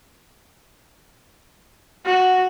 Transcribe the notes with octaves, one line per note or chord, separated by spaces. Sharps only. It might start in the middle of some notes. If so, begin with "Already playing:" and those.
F#4